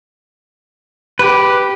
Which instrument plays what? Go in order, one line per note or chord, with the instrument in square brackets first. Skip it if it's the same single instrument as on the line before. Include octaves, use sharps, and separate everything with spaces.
[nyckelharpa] G4 [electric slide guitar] B4